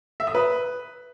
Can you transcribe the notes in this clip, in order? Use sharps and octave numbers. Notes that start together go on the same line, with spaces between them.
E5
D#6
B4